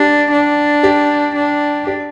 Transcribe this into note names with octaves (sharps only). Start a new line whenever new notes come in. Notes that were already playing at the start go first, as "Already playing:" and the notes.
Already playing: D4 G4
D4
G4
D4
G4